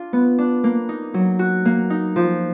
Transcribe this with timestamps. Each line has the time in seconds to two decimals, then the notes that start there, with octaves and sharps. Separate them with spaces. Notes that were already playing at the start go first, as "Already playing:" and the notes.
Already playing: D4 F4
0.13 B3
0.38 D4
0.64 A#3
0.89 D#4
1.14 F#3
1.39 F#4
1.65 A#3
1.90 D#4
2.16 F3